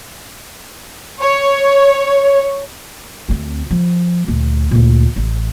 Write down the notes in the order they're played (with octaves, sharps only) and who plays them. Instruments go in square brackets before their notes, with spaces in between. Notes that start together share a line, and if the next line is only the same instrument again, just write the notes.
[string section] C#5
[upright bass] D2 C4
F3
D2 A#2
D2 A#2
A1